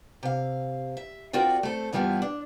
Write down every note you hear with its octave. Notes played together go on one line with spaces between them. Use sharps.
C3 F5
E5
C4 F4 F#4 A#4 D5 G5
A3 C4 A4
G2 E3 F3 G3 A#3 B3
D4